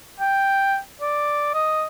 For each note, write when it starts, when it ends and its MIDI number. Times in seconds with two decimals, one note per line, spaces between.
0.20 0.77 79
1.01 1.51 74
1.54 1.86 75